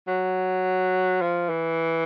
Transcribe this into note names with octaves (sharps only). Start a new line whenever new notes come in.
F#3
F3
E3